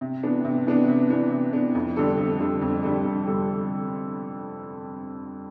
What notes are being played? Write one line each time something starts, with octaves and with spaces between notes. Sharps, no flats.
C3
E3 B3 D4
C3
E3 B3 D4
C3
E3 B3 D4
C3
E3 B3 D4
F2
D3 G3 D4 A4
F2
D3 G3 D4 A4
F2
D3 G3 D4 A4
F2
D3 G3 D4 A4